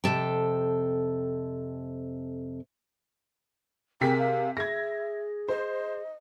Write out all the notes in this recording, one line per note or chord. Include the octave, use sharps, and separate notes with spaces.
F2 C3 A4 G5
C3 G#4 A#4 G5 B6
F5
G#4 E5 G#6 A#6
C5 D#5